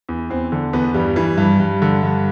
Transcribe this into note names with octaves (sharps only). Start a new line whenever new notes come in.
E2
E2 C4
D3
E2 B3
G2 G3
E3
G2
G2
D3
G2